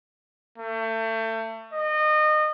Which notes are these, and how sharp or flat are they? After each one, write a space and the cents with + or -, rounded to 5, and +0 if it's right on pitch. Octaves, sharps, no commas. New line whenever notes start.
A3 +30
D#5 -25